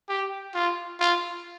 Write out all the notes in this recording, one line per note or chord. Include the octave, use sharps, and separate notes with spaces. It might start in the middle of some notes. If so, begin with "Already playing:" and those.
G4
F4
F4